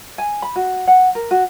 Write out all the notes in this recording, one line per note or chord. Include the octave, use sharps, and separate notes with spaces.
G#5
B5
F#4
F#5
A#4
F#4